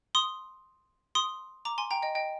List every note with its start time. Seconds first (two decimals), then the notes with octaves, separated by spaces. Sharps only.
0.15 C6 D#6
1.15 C6 D#6
1.65 A#5 D6
1.78 G#5 C6
1.91 G5 A#5
2.02 D#5 G5
2.15 D#5 G5